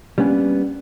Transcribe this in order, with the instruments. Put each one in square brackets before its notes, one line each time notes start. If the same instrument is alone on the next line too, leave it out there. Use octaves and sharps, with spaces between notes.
[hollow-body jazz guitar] G3 A#3 B3 C#4 D4